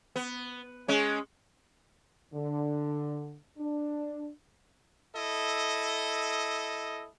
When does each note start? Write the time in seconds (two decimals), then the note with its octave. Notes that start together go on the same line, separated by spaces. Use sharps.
0.16 B3
0.88 G#3 C#4
2.34 D3
3.58 D4
5.15 E4 A4 D#5